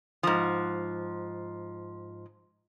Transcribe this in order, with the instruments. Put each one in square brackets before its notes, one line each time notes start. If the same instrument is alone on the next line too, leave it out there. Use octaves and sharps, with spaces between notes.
[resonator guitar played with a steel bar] G#2 F3